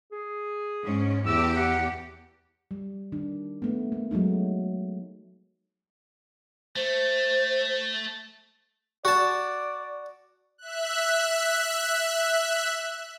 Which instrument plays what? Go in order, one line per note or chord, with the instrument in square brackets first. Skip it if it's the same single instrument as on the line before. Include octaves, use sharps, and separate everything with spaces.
[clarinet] G#4
[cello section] G#2 C#4
[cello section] E2 G4 [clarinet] E6
[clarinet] F#5
[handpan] G3
D#3 D4
A3 B3
A#3
F#3 G#3 A3 D#4
[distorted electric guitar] A3 [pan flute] C5
[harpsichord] F#4 A5 [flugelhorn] D5
[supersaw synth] E5 F#6